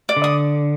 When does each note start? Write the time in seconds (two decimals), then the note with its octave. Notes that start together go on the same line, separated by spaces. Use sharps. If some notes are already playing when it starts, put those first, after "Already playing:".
0.09 D5
0.16 D3
0.24 D#6